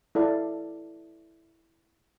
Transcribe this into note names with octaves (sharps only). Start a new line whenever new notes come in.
E4 A4 D5 F5